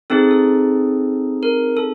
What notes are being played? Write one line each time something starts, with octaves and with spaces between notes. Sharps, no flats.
C4 D#4 G#4 A4
A4
A#4
A4